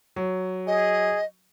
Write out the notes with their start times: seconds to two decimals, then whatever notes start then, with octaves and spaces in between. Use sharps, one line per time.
0.16 F#3
0.67 G#4 D#5